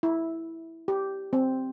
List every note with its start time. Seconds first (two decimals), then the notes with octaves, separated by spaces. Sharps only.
0.03 E4
0.88 G4
1.33 C4